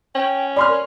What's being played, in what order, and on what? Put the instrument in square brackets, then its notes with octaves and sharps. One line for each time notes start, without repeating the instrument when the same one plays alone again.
[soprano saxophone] C#4 [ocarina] G5
[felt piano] D5 C6 F6 [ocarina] B5
[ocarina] A#4